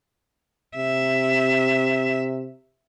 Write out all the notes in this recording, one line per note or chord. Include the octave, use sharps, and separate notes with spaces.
C3 E5